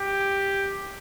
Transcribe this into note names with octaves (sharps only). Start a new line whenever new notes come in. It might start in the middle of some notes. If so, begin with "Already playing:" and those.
Already playing: G4